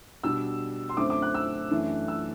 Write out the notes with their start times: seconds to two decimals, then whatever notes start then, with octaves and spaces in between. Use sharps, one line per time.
0.24 B2 G3 D4 E6
0.89 C6
0.97 F#2 D3 A3 C4 D6
1.10 D6
1.22 F#6
1.34 E6
1.71 F#2 E3 A3 D4
2.08 E6